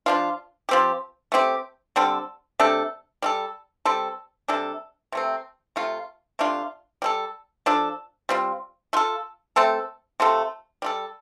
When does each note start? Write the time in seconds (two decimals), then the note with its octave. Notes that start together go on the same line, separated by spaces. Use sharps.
0.06 F3 D4 F4
0.69 F3 C4 G4
1.32 A3 C4 G4
1.96 D3 G3 C4 A4
2.59 C3 A3 D4 A4
3.22 G3 F4 A4
3.85 G3 C4 A4
4.48 C3 G3 D4 A4
5.12 C3 A3 C4
5.76 C3 A3 F4
6.39 C3 A3 D4 F4
7.02 G3 C4 A4
7.66 F3 D4 A4
8.29 G3 C4 F4
8.93 A3 F4 A4
9.56 A3 C4 A4
10.20 C3 A3 F4 A4
10.82 G3 F4 A4